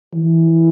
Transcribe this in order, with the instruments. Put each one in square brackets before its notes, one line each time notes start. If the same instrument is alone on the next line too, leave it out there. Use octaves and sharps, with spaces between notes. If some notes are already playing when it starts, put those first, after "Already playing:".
[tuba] E3